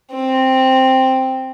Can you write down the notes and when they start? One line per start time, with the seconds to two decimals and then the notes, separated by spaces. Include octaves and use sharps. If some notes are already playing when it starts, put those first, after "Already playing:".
0.12 C4